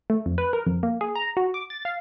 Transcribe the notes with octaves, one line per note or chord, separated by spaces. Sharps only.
A3
F2
B4
A#4
F2
A#3
G#4
A#5
F#4
D6
A6
F5